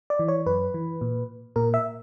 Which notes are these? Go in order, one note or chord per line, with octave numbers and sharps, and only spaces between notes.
D5
E3
C#5
F#2 B4
E3
A#2
A#2 A#4
E5